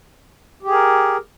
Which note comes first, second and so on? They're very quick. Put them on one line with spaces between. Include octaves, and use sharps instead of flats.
G4 G#4 A#4